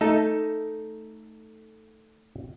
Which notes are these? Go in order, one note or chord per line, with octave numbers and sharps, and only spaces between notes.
A3 D#4 A4